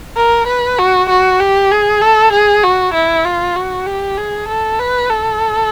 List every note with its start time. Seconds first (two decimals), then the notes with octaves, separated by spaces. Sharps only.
0.17 A#4
0.47 B4
0.79 F#4
1.10 F#4
1.40 G4
1.71 G#4
2.02 A4
2.33 G#4
2.63 F#4
2.94 E4
3.25 F4
3.56 F#4
3.86 G4
4.18 G#4
4.49 A4
4.79 B4
5.10 A4